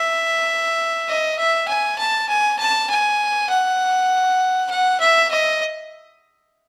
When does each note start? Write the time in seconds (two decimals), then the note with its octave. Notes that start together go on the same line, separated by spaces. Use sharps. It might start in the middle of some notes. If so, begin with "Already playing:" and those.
Already playing: E5
1.08 D#5
1.38 E5
1.68 G#5
1.98 A5
2.29 G#5
2.59 A5
2.89 G#5
3.50 F#5
4.70 F#5
5.00 E5
5.31 D#5